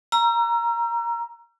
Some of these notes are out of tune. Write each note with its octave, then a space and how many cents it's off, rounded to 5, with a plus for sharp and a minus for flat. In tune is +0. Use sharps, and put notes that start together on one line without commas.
A#5 +10 E6 +40